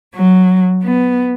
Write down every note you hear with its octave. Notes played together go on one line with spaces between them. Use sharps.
F#3
B3